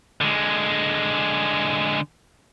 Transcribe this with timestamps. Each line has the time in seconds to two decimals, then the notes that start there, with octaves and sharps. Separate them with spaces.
0.21 D3 G#3